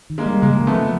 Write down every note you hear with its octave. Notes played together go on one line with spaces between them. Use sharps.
D#3
G#3 A#3
G3
C#3 G#3 A#3
F3
A3 B3
F3